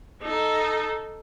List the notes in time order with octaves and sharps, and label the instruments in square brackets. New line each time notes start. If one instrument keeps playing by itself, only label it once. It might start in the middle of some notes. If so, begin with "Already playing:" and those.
[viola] D#4 A4